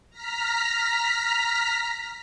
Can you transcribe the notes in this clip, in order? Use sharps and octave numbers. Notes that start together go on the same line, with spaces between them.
A#5 F6 B6